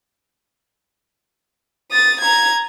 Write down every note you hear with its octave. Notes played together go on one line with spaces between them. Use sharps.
D#6 A6
A#5 G#6